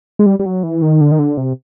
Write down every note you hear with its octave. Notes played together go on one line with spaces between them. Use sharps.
G#3
G3
G3
F#3
E3
D#3
D3
D#3
D3
C3